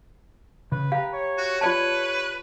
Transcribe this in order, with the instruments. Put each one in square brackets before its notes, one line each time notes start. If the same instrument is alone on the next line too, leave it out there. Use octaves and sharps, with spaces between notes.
[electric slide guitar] C#3 [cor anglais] B4
[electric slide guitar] G4 A#5 [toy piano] F5
[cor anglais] C#5
[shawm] F#4
[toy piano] F4 D5 A5 [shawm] B4